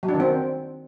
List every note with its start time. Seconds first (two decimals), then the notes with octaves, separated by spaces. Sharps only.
0.03 F#3
0.09 D4
0.14 D#3
0.20 C4